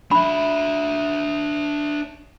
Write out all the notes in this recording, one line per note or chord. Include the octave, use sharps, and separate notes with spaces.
D4 E5 B5